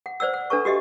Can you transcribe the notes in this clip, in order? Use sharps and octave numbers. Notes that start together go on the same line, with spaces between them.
F#5
C5 D5 F#5 E6
F#5
D4 A4 B4 A5 C#6
F#4 G4 D#5 E5